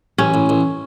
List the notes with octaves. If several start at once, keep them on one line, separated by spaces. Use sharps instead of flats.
A1 C#4
A1
A1